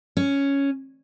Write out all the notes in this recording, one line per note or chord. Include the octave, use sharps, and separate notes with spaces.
C#4